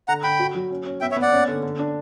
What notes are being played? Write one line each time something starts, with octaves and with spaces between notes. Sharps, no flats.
D3 F#5 A#5
D3 G5 B5
F#4
F#3
C#4
C#4
B3 E5 G5
C#5 E5
B3
D5 F#5
C#4
D3
D3
D4